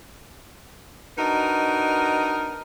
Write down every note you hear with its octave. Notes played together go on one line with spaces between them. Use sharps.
D4 D#4 F#4 A#4 B4 D#5